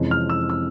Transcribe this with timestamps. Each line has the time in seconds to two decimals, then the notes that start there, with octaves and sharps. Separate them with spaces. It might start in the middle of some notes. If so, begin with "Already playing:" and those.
Already playing: F2 C3 E3 G#3 C#4
0.11 F6
0.30 E6
0.50 E6